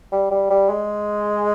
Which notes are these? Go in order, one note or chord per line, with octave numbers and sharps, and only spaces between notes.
G3
G3
G3
G#3